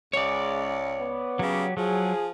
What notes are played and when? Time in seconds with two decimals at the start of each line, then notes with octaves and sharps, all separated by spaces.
0.13 C#2 C#3 G#3 C#5 D5
0.99 B3
1.39 C#3 F#3 G4
1.77 F3 F#3 G#4